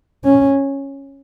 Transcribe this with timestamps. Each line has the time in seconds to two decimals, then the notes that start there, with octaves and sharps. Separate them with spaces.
0.24 C#4